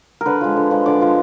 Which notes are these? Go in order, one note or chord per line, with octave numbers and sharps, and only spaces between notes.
D3 A#4 B4
F3 G#3
D3
F3 G#3
D3 D5
F3 G#3